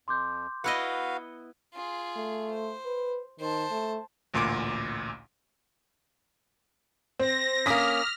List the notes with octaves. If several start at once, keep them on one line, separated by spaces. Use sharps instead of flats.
F2 C6 D6 G6
B3 E4 F#4 B4 D#5 F5 C#7 G7
F4 G#4
A3
C5
B4
D#3 C5 A5
A3
A1 D2 A#2 C6 D6 D7
C4 A#6
A#3 C#4 D6 D#6 F6 B6